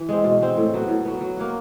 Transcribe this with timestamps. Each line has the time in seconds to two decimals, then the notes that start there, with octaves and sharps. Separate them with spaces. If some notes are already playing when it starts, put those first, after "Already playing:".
Already playing: E3
0.09 G#3 C4
0.24 B2
0.41 G#3 C4
0.57 A2
0.74 F#3 B3
0.89 A2
1.05 F#3 B3
1.21 F#3
1.37 A#3 C#4 F#4